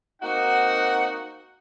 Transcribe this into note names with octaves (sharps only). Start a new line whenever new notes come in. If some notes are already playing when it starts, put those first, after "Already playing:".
A#3 C4 D#4 F#4 F#5